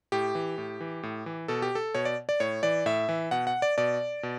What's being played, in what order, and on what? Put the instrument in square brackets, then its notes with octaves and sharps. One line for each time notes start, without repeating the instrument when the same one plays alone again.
[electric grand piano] A2 G4
E3
A2
E3
A2
E3
B2 A4
G4
A4
B2 C#5
D5
D5
A2 C#5
E3 D5
A2 E5
E3
B2 F#5
F#5
D5
B2 D5
B2